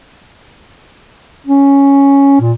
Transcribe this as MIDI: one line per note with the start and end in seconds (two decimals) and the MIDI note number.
1.47 2.39 61
2.40 2.53 46